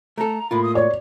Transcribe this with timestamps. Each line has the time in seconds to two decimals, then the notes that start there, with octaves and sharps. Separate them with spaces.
0.18 A3 A4 A#5
0.51 A2 A#3 F4 B5
0.63 D#6
0.75 C#5 D5